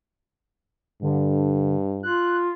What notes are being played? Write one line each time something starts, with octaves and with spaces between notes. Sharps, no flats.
G2 D3
F4 F#6